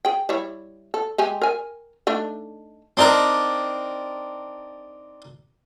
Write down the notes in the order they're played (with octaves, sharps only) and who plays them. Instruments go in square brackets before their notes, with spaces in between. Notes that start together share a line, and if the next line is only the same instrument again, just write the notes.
[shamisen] G#4 G5
G3 E4 C#5
A4
G#3 G4 G#5
A#4 G#5
A3 D4 D#4
[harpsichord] C4 D4 D#4 A#4